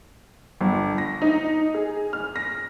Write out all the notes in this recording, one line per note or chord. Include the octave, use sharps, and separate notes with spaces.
G1
A#6
D#4
G#4
F6
A#6